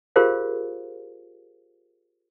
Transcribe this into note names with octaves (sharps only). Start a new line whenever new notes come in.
F4 G4 G#4 A#4 C5 F5